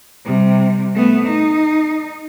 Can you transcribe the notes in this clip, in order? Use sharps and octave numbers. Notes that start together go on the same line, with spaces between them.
C3 G3
A3 B3
D#4